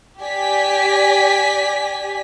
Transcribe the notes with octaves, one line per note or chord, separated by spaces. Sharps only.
G4 D5 G#5 B6